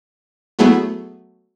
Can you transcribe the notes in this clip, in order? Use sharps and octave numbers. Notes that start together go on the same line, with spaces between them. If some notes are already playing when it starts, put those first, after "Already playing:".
F#3 A3 B3 E4 G#4 B4